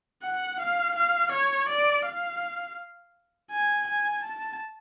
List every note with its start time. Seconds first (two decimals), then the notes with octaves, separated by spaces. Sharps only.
0.23 F#5
0.60 F5
0.96 F5
1.32 C#5
1.69 D5
2.06 F5
3.51 G#5
3.88 G#5
4.24 A5